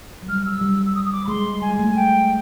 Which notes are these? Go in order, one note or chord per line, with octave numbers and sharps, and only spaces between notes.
F#3
G3 F6
E6
G3
E6
D#6
D#6
D6
B5
G#3 C6
G3 G#5
G#3
A3
G#3
G3 G5